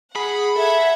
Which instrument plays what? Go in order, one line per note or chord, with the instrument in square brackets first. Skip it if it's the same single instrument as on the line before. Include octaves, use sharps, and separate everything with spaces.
[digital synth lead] G#4 [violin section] F#5 [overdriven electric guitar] B5
[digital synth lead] A4 [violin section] E5 F#5 G#6